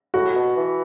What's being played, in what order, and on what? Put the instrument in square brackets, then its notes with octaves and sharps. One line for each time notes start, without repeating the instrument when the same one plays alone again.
[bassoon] A2 [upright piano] F#4
[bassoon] B2
E3